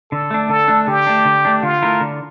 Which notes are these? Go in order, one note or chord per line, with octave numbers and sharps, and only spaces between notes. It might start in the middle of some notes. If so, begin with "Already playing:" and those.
D3 A4
A3 D4
D3 A4
A3 D4
D3 G4
A3 D4
D3
A3 D4
D3 F4
A3 E4 A#4
D3